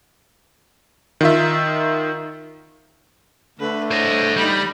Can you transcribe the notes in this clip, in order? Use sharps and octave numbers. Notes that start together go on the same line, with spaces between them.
D#3 F4 E5
D3 A3 B4
C5 C#5 D#5
G3 D#4 B5